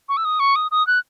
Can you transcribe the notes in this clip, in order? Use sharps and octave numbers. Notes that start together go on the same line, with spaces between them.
C#6
E6
D#6
C#6
D#6
D#6
F#6